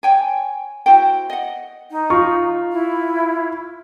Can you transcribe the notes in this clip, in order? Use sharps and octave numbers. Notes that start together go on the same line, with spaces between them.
C#5 G5 G#5
E4 F#4 C5 G5
D#5 F#5
D#4
F4 C#6
E4